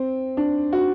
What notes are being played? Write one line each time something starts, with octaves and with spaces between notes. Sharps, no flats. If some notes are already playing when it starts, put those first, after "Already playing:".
Already playing: C4
D4
F#4